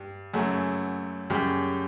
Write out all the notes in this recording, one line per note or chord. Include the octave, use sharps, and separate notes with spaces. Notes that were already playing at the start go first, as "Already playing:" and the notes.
Already playing: G2
F#2 C#3 F#3 A3
F#2 C#3 G3 G4